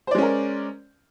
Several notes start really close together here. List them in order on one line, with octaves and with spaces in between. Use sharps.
C5 D5 G#3 C#4 A#4